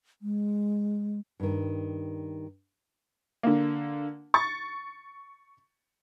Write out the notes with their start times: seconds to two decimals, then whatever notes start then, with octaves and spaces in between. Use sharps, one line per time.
0.22 G#3
1.40 G2 D#3
3.43 D3 A#3
4.34 C#6 A6